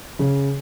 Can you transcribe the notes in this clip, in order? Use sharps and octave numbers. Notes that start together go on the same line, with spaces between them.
C#3